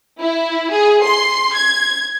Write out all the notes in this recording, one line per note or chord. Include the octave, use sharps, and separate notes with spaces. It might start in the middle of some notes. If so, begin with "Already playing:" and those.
E4
G#4
C6
G#6